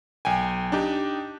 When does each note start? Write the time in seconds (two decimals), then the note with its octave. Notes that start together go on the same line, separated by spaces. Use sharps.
0.25 B1 G5 G#5
0.72 D4 D#4 G4